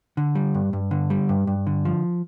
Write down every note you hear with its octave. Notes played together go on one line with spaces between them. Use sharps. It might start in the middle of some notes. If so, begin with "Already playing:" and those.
D3
G3
G2
G2
D3
G3
G2
G2
D3
F3